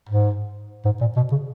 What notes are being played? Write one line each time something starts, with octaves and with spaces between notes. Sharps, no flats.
G#2
G#2
A#2
B2
C#3